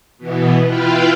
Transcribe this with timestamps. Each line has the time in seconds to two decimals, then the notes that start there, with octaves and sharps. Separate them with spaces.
0.18 B2 E3 B3
0.67 E4 F4 B4 F5 G5